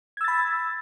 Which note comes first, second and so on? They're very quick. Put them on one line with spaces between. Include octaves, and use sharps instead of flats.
G#6 E6 A6 B5